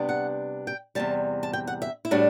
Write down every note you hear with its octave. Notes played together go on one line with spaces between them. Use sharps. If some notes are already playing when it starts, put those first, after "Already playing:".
Already playing: C3 G3 B3 D4
F#5
G5
E2 C3 G3 A5
A5
G5
F#5
E5
E4
A2 G3 D4 F#4